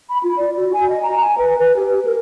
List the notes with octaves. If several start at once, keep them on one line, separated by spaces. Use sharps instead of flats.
B5
F4
D5
F#4
G#5
D#5
A#5
G#5
B4
B4
G4
A#4